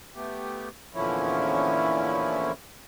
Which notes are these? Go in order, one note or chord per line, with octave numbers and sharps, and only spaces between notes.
A3 B3 G4
E2 A#2 D3 F3 C#4 E4